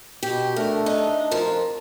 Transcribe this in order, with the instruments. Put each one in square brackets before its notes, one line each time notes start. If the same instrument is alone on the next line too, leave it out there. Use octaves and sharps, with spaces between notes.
[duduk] B2 [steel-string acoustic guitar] G4
[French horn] A3 [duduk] D4 [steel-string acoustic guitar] A#4
[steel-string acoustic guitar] D#4
[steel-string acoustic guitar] F2 F3 [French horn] A#4